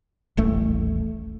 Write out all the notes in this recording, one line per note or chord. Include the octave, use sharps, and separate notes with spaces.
D#1 A1 A3